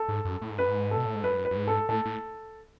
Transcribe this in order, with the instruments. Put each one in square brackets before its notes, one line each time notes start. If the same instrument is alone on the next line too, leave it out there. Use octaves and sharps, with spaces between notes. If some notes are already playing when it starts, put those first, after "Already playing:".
Already playing: [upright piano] A4
[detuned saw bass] G#2
F#2
A2
G#2
[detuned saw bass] F#2 [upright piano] B4
[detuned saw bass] G#2
[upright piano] A4
[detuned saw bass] B2
A2
G#2
[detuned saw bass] F#2 [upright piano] B4
[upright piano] B4
[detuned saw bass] F#2
G#2
[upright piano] A4
[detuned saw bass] A2 [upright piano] A4
[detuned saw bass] A2